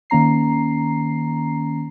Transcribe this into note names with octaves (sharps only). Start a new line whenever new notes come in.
D#3 A#3 C#4 A#5 C7